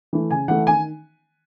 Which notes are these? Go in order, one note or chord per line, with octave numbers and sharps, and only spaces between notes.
E3 A3
C#3 G#5
E3 A3 F#5
D#3 G#5